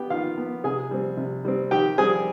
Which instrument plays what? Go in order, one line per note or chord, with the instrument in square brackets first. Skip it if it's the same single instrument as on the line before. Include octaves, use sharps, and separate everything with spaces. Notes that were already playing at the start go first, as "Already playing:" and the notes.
Already playing: [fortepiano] B3 G4 G5
D#3 F4 F5
B3
C3 G#4 G#5
G3 C4
C3
G3 C4
D#3 G4 G5
G3 C4 G#4 G#5